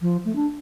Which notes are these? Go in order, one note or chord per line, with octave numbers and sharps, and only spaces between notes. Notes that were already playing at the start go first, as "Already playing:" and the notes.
F3
A3
D4